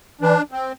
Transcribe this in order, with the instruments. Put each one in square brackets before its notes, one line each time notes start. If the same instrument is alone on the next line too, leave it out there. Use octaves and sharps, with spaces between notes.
[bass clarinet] E3 [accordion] D4
[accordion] C4